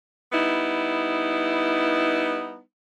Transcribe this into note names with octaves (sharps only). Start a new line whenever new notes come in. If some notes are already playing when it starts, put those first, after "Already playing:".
G3 B3 D#4 E4